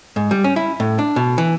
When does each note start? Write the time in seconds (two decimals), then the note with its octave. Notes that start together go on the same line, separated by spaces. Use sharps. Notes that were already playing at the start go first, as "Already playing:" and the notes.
0.16 G#2
0.31 G3
0.44 C#4
0.56 E4
0.80 A2
0.99 D4
1.16 B2
1.38 E3